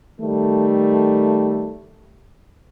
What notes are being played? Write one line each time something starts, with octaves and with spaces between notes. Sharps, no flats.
D#3 G3 A3